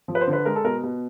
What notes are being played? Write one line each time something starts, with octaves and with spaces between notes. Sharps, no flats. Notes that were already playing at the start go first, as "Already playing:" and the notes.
F3
B4
C5
D3
B4
G#3 A#4
A4
B2 A#4
B2